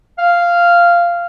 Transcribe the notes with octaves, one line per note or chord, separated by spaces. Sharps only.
F5